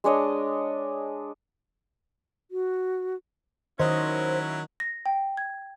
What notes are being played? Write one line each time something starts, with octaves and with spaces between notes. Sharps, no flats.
G#3 D4 C#5 D#5
F#4
D#3 F#3 C#4 E4 C5 D#5
A#6
G5
G#6